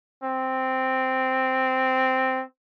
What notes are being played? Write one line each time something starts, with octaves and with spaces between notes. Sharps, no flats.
C4